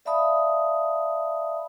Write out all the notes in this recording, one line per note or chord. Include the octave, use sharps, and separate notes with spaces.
D5 E5 F5 A5 B5 D#6